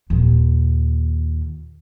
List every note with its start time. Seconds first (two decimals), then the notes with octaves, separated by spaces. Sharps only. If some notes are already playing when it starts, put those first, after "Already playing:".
0.10 D#2 A#2